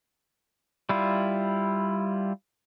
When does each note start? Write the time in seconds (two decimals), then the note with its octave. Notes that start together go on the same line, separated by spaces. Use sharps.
0.89 G3 E4 F4